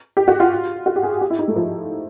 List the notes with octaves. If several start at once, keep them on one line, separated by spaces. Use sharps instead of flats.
G4
F#4
F4
F#4
G4
G#4
G4
E4
D#4
A3
F3